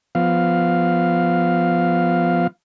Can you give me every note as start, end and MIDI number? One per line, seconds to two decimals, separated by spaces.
0.15 2.47 53
0.15 2.47 59
0.15 2.47 77